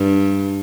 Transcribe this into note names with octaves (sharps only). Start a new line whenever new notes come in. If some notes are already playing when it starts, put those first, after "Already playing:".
Already playing: G2